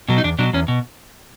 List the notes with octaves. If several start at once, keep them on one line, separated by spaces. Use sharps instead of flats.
B2 F#3
D#4
E2 D4
B2 F#3 D4
E2 C#4
B2